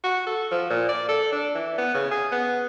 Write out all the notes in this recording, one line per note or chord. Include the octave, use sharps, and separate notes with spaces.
F#4
A4
F3
A#2
D5
A4
D4
E3
B3
C#3
G#4
B3